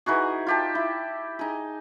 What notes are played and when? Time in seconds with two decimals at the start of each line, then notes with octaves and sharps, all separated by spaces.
0.06 E3 D#4 F#4 G#4
0.47 F4 G4 A5
0.75 E4
1.39 D#4 G#4